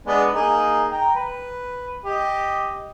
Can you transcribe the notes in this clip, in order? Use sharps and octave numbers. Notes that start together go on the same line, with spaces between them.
G#3 B3 D4
A#3 D#4 G#4
G5 A#5
B4
G4 D#5